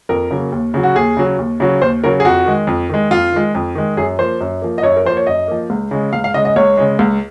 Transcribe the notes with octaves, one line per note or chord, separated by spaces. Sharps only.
F2 A#4
C#3 F#3 A#3
D#2
C#3 F#3
F#4
D#2 G#4
C#3 F#3
D#2
C#3 F#3
D#2 C5
C#3 F#3 A#4
G#4
F2 F#4
D#3 G#3
F2
D#3 G#3
F2 F4
D#3 G#3
F2
D#3 G#3
F#2 G#4
F3 A#3 C5
F#2
F3 A#3
D#5
F#2 C#5
A#4
F3 A#3 C5
C#5
F#2 D#5
F3 A#3
C#2
C#3 G#3
C#2 F5
F5
C#3 G#3 D#5
D#5
C#2 C#5
C#3 G#3
C#2